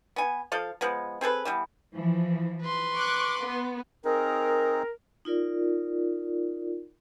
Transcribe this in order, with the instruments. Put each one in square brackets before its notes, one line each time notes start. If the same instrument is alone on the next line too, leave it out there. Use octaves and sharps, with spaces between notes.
[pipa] B3 G#5
F3 A4 F5
F3 G#3 B3
C4 G#4 A4 B4
E3 G3 B3
[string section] E3 F3
[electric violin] B4 C6
[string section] C#6 D6 F#6
B3
[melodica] C4 D#4 G#4 [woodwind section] A#4
[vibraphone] D#4 F4 A#4 D5